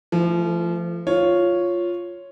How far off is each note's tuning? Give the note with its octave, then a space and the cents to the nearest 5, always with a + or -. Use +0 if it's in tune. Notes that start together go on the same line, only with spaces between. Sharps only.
F3 -30 A3 +0
F4 +0 C#5 +0